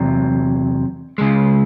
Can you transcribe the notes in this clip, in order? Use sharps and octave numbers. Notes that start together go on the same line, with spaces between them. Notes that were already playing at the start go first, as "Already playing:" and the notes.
Already playing: E2 C3 F#3
C#2 C#3 G#3